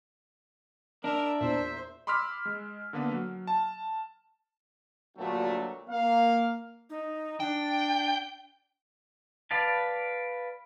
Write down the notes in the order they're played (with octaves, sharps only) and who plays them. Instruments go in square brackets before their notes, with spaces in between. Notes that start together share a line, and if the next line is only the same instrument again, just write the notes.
[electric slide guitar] D4 [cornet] A#4 [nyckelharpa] E5
[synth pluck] E2 A#2 [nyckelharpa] C5 [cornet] E5
[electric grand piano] B5 C6 D6 E6 F6 B6
G#3
D3 A#3 B3 B4
F#3
A5
[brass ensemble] D2 G2 A#2 F#3 A3
A#3 F5
[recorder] D#4
[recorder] D4 [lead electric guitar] G5
[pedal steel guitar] B4 D5 F5 A5